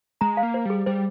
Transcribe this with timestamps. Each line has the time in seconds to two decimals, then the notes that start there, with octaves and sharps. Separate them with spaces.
0.21 G#3 A#5
0.37 F5
0.43 A#3
0.54 C5
0.65 G3 G#4
0.86 G3 C5